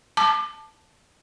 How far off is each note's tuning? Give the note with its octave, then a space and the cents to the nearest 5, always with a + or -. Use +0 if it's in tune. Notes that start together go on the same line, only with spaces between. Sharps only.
A5 +0 D6 +25